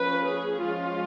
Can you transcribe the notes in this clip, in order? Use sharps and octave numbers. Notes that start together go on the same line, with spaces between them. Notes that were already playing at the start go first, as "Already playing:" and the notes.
Already playing: F3 A#3 C#4 B4
G#4
F3 G#3 C#4 F4